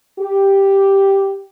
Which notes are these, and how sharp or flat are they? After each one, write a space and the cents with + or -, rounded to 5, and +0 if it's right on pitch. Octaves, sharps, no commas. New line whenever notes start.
G4 +0